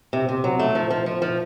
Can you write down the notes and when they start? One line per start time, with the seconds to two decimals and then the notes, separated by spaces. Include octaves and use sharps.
0.13 C3
0.29 C3
0.44 F#3
0.59 A3
0.75 F3
0.91 F3
1.06 F3
1.22 F3